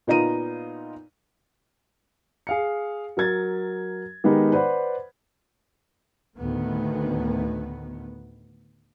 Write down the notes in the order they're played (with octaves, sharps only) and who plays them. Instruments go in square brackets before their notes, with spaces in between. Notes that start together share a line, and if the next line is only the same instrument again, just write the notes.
[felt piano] A#2 B3 D#4 F4 A#5 D#7
[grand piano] G#4 F5 C#7
F#3 A#4 G#6 A6
D#3 G#3 B3 D#4 G4 A#4
B4 C5 D5 F#5 B5
[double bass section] D2 A2 D#3 B3